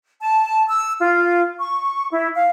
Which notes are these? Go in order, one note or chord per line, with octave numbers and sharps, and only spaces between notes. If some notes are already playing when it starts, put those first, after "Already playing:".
A5
E6
F4
C#6
E4
F5